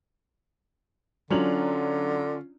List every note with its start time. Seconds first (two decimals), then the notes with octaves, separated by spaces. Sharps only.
1.30 D3 F#3 C#4 D4 F4 F7 F#7